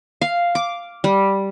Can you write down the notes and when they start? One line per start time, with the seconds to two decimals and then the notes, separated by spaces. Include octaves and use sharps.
0.21 F5
0.55 D6
1.04 G3